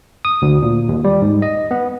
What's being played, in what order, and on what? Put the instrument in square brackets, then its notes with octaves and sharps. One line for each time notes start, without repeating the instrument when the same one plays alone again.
[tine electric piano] D#6
D2
A#2
D#2
G3
G#2
D#5
B3